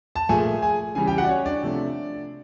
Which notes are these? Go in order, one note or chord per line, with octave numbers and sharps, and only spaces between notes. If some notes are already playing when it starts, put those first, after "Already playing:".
A5
A#2 F3 A3 G#4 G#5
G#4 G#5
C#3 E3 G3 G#4 G#5
G4 G5
F#4 F#5
D5
C#4 C#5
D4 D5
C3 F3 A3